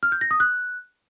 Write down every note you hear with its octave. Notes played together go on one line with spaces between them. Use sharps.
F6
G6
A#6
D#6
F#6